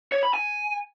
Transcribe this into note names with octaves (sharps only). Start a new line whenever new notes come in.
C#5
B5
G#5